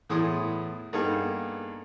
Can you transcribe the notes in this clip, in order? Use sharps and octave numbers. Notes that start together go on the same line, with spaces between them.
E2 A2 E4 G#4 C6 D#6
G2 A#3 B3 D#4 G#4 A4